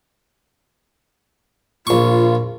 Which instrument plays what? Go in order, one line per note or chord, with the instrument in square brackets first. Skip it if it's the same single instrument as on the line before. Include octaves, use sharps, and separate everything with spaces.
[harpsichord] A#1 C#6 [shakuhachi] F4